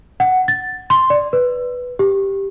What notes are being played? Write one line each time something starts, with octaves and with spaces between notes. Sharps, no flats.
F#5
A6
C6
D5
B4
G4